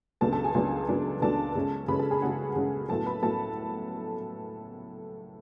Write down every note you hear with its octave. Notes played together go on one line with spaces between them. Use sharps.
C#2 C#3 F#3 B3 D4 A4 A5
A4 A5
G#4 G#5
C#2 C#3 F#3 B3 D4
C#2 C#3 F#3 B3 D4
C#2 C#3 F#3 B3 D4 A4 A5
C#3 G#3 C#4
C#3 G#3 C#4 B4 B5
A4 A5
G#4 G#5
C#3 G#3 C#4 F#4 F#5
C#3 G#3 C#4
A2 F#3 B3 A4 A5
B4 B5
A2 F#3 B3 A4 A5